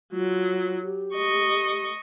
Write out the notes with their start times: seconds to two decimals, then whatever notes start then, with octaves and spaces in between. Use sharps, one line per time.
0.12 F#3 F4
0.84 G4
1.13 D#5 C#6